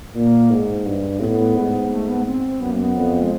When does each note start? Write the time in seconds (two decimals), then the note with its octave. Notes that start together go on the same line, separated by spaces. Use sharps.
0.14 A#2 A#3
0.50 G#2
0.85 G2
1.20 A2 C4
1.24 B3
1.55 G#2
1.91 A3
2.08 B3
2.26 C4
2.61 F#2 B3
2.70 A#3
2.80 B3
2.96 F2
3.22 G#3